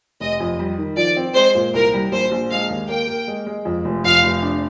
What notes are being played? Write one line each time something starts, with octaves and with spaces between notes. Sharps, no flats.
F1 D#5
F2
G3
D#3
F3 D5
C4
G#3 C5
A#2
C2 A#4
G3
A#1 C5
A#1
G#3 F5
D#2
A#3 G5
A#3
G#3
G#3
F2
F1
F2 F5
F1
D4